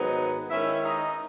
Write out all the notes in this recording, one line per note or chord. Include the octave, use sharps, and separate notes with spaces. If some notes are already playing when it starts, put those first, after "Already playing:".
Already playing: G#2 D#3 F#3 B3 D#4
D#3 G#3 C#4 E4 E5
D#4 D#5